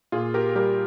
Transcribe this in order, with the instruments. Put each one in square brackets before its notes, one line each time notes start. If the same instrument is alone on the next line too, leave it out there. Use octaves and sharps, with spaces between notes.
[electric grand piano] A#2 F4 G#4
G4 A#4
G3 G4 A#4